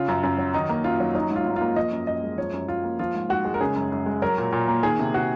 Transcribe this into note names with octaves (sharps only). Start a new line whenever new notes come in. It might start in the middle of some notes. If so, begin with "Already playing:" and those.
Already playing: C#3 F4
F#2
F#2
F#3
D#3 D#4
A#3
F#2 F4
F#3
F#3 D#4
G#2
F4
G#2
A#3 F4
F3 D#5
F#2
F#2 D#5
G#3
F3 C#5
F#2
F#2 F4
A#3
F3 F4
G#2
G#2 F#4
G#3
A#4
C#3 G#4
F#2
F#2
G#3
F#3 A#4
A#2
A#2
A#3
D#3 G#4
C3
C3 F#4